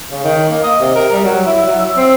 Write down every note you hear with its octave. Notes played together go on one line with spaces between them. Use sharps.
C#3
D#3
A#3
D#5
C3
A#4
G3
F#3
E4
F#3
E5
C4